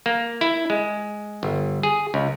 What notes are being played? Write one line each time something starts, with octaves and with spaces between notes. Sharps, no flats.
A#3
E4
G#3
G1
G#4
C#2